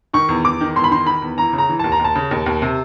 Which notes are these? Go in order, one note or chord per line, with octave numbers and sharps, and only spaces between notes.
D#3 C#6
E2
E2 D6
D#3
E2 C6
B5
D#3 C6
D#3 B5
E2
E3 A#5
C#3
A#5
E3
D#2 A5
A#5
D#2
A5
C#3
D#2
D#2
C3